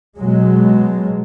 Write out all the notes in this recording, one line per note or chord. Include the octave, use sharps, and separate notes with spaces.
B2 F#3 G#3